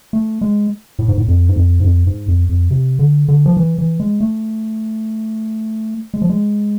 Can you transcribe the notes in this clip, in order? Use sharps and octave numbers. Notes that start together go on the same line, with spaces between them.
A3
G#3
A2
G#2
A2
F2
G#2
F2
G#2
F2
G#2
F2
F2
C3
D3
D3
F3
E3
E3
G#3
A3
G#3
F3
G#3